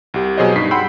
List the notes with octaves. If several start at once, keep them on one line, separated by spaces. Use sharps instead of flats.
C2 G4
B2 F#3 G#4 C5 C#5 D#5
G2 D#4 B6 C7
F#5 G5 B5 C6 E6 G6